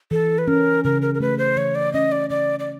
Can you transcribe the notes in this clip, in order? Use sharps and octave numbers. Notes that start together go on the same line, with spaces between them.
E3 A4
B4
C#4 A#4
C#3 A#4
A#4
A#4
A3 B4
C5
E3 C#5
D5
C#4 D#5
D5
C#3 D5
D5